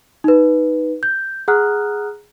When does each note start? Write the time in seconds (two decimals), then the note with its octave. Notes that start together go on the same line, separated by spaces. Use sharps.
0.24 D#4 B4
1.03 G6
1.48 G#4 F#5 A#5 D#6 F6 F#6